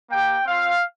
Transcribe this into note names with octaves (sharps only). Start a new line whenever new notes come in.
A#3 G4 G5
C4 F4 F5